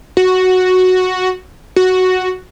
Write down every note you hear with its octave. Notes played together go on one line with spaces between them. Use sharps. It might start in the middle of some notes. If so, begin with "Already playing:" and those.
F#4
F#4